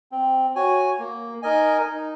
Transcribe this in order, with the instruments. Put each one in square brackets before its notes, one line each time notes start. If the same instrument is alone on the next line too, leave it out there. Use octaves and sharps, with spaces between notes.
[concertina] C4
F#4 C#5 G#5
A#3
D#4 A#4 D#5 G#5
D#4